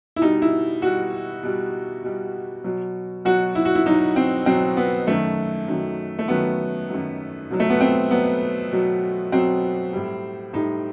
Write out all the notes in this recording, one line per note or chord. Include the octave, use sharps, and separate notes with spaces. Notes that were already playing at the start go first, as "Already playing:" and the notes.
E4
B2 G3 D#4
E4
B2 G3 F#4
B2 G3
B2 G3
B2 F#3
B2 F#3 F#4
E4
F#4
E4
B2 F#3 D#4
C4
B2 F#3 C4
B3
F#2 D#3 F#3 A3
F#2 D#3 F#3
A3
F#2 D#3 F#3 B3
F#2 D#3 F#3
B2 F#3
A3
B3
C4
B2 F#3 B3
B2 F#3
B2 F#3 C4
A2 G3
A2 G3 D#4